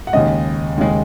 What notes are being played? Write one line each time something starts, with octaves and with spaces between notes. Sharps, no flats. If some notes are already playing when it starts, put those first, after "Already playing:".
F#5
D#2 C#3 G#3 D#5
D#2 C#3 G#3